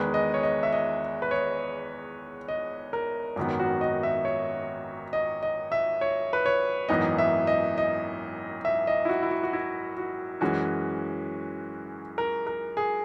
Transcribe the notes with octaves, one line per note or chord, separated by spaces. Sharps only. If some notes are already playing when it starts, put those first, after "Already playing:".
Already playing: E2 D#3 G#3 B4
D#5
C#5
D#5
E5
D#5
B4
C#5
D#5
A#4
G#1 F#2 D#3 F#3 B3
F#4
D#5
E5
C#5
D#5
D#5
E5
C#5
B4
C#5
G#1 F#2 E3 B3 D#4 D#5
E5
D#5
D#5
E5
D#5
E4
F#4
E4
F#4
F#4
E4
F#4
F#2 E3 G#3 C#4 F#4
A#4
A#4
G#4